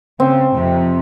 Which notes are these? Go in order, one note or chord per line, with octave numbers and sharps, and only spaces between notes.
C#3 C4
F2 C3